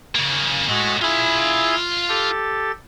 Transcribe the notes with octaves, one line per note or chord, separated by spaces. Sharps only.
C#3 A#3
A2 G#3 A3 F#4
E4 F4 G#4 E5 B5
G4 A4 A6